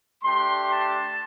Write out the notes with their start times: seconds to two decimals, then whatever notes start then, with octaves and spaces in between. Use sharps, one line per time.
0.23 A3 D4 G4 C6
0.70 A5